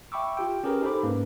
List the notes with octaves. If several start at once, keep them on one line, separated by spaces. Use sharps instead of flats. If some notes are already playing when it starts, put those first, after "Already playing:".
E5 G5 B5 C#6 D6 E6
F4 G4 G5
C#4 G4 G#4 A#4 B4
D#4 G4 A4 C5 B5 D6
G#2 A#3 C#4 B4